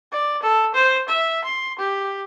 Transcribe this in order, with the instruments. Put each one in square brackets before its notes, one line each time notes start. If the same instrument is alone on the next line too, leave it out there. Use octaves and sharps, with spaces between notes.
[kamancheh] D5
A4
C5
E5
C6
G4